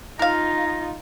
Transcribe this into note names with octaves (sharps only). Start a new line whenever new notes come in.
D#4 F4 A#4 F5 A#5